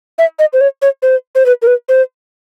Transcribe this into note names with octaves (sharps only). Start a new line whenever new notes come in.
E5
D#5
C5
C#5
C#5
C5
C5
B4
A#4
B4
C5